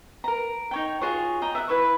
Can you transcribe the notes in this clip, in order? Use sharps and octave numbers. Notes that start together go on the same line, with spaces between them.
A#4 A#5
D#4 C#5 G5
F4 F#4 G#4 C#5
D#5 G5 A#5
E5 F#5
E4 B4 E5 C#6